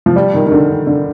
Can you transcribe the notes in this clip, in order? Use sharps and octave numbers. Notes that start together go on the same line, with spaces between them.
F3
G3
D#3
D#3
D3
D3